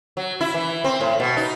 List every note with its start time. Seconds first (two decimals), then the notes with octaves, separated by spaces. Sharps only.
0.17 F#3
0.41 E4
0.54 E3
0.84 C4
1.01 A2
1.20 B2
1.37 D#4